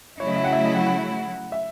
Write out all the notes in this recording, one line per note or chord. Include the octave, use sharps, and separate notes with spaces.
C#3 F#3 A3 E4 C#5
D#5
E5
F#5
E5
D#5
F#5
F#5
E5